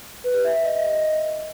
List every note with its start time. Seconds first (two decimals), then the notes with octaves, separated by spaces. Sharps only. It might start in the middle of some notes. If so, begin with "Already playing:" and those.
0.24 B4
0.34 G4
0.44 E5
0.54 E5
0.65 D#5